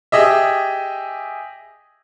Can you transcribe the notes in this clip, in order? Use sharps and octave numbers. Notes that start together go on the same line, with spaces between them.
G4 G#4 D#5 E5